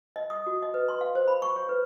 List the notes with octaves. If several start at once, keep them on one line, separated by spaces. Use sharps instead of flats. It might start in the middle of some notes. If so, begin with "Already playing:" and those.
D#5
D#6
F#4
D#5
B4
C6
F5
C5
B5
C#6
C#5
B4